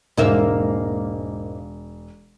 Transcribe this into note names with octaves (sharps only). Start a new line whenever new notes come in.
E1 G#2 A#3 E5